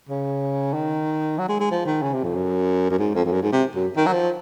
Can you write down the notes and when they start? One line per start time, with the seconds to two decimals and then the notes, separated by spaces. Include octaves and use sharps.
0.09 C#3
0.74 D#3
1.38 F#3
1.49 G#3
1.60 G#3
1.71 F3
1.86 D#3
2.02 C#3
2.14 C3
2.23 F2
2.35 F#2
2.90 F#2
2.99 G#2
3.15 F2
3.25 F2
3.32 F#2
3.43 G#2
3.52 C3
3.75 F#2
3.97 D#3
4.06 F#3
4.13 F3